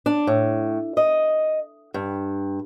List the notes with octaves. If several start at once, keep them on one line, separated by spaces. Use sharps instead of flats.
D4
A2
D#5
G2